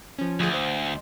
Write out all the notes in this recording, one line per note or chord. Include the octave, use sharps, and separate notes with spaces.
F3 C#4
D2 F3 G#4
C5